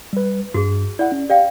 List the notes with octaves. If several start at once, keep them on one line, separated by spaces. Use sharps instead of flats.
G3 B4
G2 F#4 G#4
E4 D5 F#5
C#4
G4 D5 F5 G5